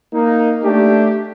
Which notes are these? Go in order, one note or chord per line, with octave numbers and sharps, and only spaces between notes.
A#3 D#4
A3 D4 G4